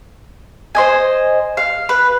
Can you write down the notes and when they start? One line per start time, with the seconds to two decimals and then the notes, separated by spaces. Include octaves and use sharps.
0.75 C5 D#5 G#5
1.57 F5
1.89 B4